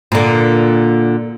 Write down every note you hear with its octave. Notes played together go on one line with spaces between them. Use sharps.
A#2 D3